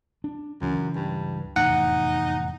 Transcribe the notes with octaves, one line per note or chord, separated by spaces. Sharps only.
D4
C#2 F#2 E3
G2
F1 E2 A2 D#4 F#5